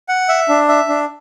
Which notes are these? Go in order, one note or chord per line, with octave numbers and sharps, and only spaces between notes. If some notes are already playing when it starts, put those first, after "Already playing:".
F#5
E5
D4
E5
D4